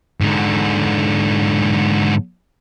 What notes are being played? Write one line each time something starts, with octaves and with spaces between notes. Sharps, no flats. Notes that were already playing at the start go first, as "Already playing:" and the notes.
G#2 D3